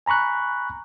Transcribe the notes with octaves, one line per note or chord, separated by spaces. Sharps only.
G#5 A#5 B5 C#6 F#6